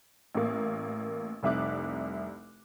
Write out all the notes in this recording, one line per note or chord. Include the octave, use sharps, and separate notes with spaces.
A1 A#3
F1 C2 E5 D6 F#6